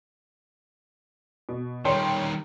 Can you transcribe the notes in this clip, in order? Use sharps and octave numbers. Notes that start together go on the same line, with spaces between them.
B2
D#3 G3 C#5 G5 C6